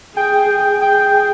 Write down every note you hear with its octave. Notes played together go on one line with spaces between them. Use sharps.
G#4 G5
G#4
G5